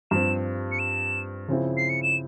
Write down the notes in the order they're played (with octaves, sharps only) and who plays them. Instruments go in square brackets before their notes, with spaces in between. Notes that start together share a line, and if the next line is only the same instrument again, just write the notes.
[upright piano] G2 F3 C4 [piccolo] E7
[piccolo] C#7
E7
[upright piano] C#3 F3 C4 E4
[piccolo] C7
C#7
E7